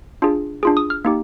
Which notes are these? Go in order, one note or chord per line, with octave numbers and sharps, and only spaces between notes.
D4 F4 G#4
D4 F4 G#4
D#6
F6
A#3 D#4 G4